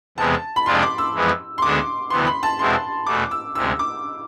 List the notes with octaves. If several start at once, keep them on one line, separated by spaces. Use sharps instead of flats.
E2 C3 G#3 B3 A5
B5
F2 C3 G#3 D4 F4 C6
D6
E6
F2 E3 G#3 B3
C6
D2 D3 G#3 B3 D4 D6
D2 C3 E3 B3 C6
B5
A5
E2 B2 G#3 C4 E4 C6
E2 B2 A3 D6
E6
D2 C3 G#3 E6
D6